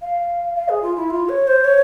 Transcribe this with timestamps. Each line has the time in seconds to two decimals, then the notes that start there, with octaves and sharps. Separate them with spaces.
0.02 F5
0.56 F5
0.69 G#4
0.82 F4
0.96 E4
1.10 F4
1.29 C#5
1.47 C5
1.64 C#5